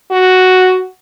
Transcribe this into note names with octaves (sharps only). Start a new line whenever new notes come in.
F#4